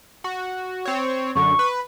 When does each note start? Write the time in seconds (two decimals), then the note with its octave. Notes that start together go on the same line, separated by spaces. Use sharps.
0.24 F#4
0.85 C4 C#5
1.35 F#2 D3 C#6
1.59 B4